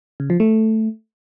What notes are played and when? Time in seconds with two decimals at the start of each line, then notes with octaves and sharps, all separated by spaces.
0.20 C#3
0.30 F3
0.40 A3